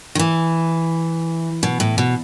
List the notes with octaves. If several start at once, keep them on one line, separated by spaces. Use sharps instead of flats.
D#3
E3
B2
A2
B2